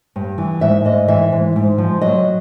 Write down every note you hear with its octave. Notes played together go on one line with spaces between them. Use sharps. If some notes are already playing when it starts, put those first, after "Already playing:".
G2
E3
G#2 E5
G#2 D#5
E3 E5
G#2
G#2
F3
F#3 D#5